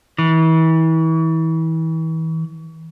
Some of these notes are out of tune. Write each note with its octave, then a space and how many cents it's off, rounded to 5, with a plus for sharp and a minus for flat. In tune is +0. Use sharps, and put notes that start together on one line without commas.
E3 -35